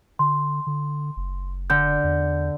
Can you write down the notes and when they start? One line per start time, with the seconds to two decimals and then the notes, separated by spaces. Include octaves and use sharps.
0.19 D3 C6
0.67 D3
1.17 F#1
1.70 D3 G6
2.04 E2